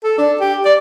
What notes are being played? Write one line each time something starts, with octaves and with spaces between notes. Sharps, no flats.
A4
D4
G4
D5